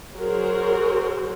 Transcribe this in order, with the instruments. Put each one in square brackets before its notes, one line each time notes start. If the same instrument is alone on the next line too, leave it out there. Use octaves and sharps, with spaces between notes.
[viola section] F#3 F#4 G#4 A#4 C5